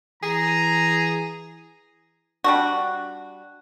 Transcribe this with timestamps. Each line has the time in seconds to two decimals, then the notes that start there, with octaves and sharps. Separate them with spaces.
0.23 E3 G#4 A#5
2.44 G3 D4 F#4